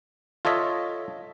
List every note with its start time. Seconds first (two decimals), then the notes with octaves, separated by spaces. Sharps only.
0.45 F4 A4 C#5 D#5 E5